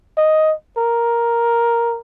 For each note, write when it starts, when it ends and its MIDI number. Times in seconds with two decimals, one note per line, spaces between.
0.17 0.53 75
0.77 1.99 70